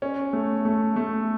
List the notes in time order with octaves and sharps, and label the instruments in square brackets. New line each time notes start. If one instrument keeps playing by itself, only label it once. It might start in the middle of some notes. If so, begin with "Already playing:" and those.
[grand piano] C#4
A3
A3
A3